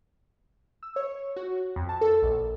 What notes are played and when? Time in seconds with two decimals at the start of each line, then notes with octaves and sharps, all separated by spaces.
0.83 E6
0.96 C#5
1.36 F#4
1.76 F2
1.89 A5
2.01 A4
2.22 A#1